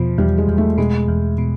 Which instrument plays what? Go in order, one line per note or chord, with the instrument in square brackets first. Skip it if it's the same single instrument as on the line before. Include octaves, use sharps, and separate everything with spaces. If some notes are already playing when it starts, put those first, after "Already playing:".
Already playing: [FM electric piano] E2 B2 [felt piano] F3
[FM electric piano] E2 [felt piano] G3
[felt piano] G#3
[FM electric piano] E2
[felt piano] A3
[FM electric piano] B2 [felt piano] G#3
[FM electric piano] E2
B2